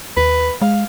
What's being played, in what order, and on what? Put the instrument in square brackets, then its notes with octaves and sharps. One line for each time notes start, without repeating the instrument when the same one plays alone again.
[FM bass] D#2 [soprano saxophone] B4
[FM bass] G#3 [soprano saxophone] F5